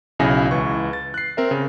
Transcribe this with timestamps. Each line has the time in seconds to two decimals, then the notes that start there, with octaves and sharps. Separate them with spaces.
0.19 B1 C#3 E4 G#5 A#6
0.51 C#2 E3 C#6
0.93 A6
1.14 F#6 C7
1.37 C4 A#4 E5
1.51 C#3